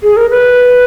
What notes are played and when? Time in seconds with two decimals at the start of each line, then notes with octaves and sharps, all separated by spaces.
0.03 G#4
0.17 A#4
0.30 B4